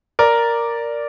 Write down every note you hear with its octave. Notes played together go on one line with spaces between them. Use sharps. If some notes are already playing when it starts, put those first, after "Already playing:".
A#4 D5